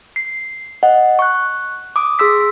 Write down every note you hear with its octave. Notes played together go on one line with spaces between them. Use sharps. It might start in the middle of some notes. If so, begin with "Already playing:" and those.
C7
D#5 F#5
C#6 F#6
D6 D#6
G#4 C6 E6 B6